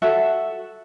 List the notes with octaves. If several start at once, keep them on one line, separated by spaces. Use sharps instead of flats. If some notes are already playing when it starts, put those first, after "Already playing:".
F#4 A4 E5 F#5